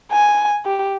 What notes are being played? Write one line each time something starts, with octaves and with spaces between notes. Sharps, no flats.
G#5
G4